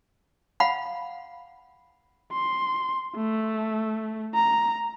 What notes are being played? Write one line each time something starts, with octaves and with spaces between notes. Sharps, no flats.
F5 F#5 B5
C6
A3
A#5